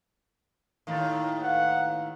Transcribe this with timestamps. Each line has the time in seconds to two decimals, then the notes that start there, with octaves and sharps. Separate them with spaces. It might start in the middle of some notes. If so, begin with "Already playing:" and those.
0.87 D#2 A2 D#3 F5 A6
1.43 B4 F5 F#5